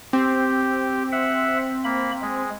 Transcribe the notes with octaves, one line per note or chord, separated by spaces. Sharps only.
C4 G4
E5 F#5
A#3 B5
G#3